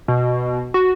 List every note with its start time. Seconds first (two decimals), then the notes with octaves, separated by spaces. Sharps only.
0.08 B2
0.74 F#4